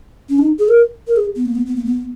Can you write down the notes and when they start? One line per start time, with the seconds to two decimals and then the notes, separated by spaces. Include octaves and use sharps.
0.29 C#4
0.38 D#4
0.59 G#4
0.68 A#4
1.07 A#4
1.16 G#4
1.36 B3
1.45 A#3
1.55 B3
1.66 B3
1.76 A#3
1.85 B3